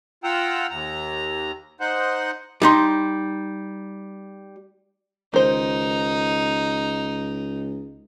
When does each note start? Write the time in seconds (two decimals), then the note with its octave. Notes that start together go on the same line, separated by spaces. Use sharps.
0.24 F4 F#5 G5 A#5 E6
0.70 D#2 A#5
1.80 D#4 C5 F#5
2.62 G3 D#4 C6
5.34 C#2 D#3 D#4 C5